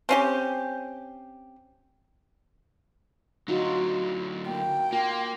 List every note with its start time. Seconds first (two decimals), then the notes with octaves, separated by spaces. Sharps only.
0.09 C4 C#4 G4
3.48 D3 F#3 D#4 F4 F#4
4.48 A#3 G5
4.92 A#3 F4